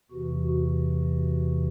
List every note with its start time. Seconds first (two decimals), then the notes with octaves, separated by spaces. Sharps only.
0.11 E2 C3 E3 F#4
0.47 F#4